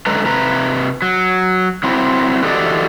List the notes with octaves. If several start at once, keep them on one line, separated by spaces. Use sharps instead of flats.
F#2 D3 G#3 A4 B4 A#5
C3 B4 A#5
F#3
F#3 C4 E4
E3 F#4 G4 A4 D5 D#5